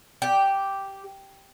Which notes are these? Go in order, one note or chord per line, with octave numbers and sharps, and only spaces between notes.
G4